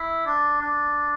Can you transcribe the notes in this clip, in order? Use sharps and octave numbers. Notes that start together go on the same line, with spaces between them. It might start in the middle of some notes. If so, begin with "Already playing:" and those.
Already playing: E4
D4
D4